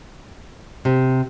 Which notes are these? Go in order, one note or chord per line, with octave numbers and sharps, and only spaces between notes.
C3